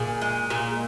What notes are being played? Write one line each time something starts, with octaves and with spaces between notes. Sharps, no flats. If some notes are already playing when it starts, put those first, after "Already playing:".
Already playing: A#2 G#4
G#3
A#2